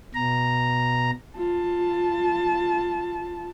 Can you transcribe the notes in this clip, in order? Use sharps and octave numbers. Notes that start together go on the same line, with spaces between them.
B2 A#5
F4 A5